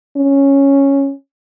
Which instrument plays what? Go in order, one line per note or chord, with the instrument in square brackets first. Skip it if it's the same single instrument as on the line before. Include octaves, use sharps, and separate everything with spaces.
[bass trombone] C#4